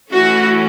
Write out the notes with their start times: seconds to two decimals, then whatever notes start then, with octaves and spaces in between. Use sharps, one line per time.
0.10 E3 A3 C#4 F#4